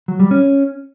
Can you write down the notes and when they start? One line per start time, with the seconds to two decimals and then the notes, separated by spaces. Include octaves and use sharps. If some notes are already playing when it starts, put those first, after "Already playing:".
0.08 F#3
0.20 G3
0.31 C#4